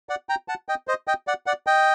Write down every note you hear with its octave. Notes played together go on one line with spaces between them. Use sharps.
D5 F#5
G5 A#5
F#5 A5
D#5 G5
C5 D#5
D#5 G5
D5 F#5
D5 F#5
D#5 G5